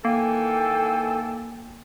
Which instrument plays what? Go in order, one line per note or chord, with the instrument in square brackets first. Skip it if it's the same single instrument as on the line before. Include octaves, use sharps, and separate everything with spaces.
[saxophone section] D#3 E3 A4 [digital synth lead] A#3 [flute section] F5 G5 [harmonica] G#5